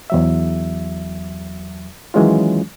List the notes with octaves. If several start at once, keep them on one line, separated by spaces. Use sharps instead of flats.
E2 F#3 E5
D#3 E3 F#3 G#3 C#4 F4